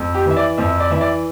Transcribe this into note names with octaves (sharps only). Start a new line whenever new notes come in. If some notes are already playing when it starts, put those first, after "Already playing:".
Already playing: F2
G4
E3 E5
D5
F2 E5
D5
E3 E5
D5